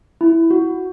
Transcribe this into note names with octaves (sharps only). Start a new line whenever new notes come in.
E4
F#4